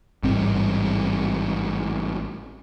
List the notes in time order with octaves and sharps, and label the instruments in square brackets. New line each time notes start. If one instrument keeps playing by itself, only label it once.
[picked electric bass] A1 G#2 G3 C4